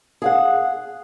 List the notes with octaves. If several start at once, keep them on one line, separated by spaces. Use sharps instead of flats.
G#4 F5 F#5